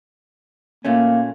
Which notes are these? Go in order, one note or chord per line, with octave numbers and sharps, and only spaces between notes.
A#2 A3 A#3 C#4